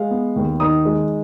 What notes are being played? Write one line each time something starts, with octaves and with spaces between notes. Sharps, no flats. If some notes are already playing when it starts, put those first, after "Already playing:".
Already playing: G#3 F5
B3
D#2
D#3 D#6
G#3